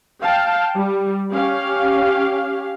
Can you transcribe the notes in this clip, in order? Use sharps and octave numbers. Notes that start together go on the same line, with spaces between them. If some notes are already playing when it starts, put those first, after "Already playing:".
F5 G5 A5
G3
C#4 G4 F5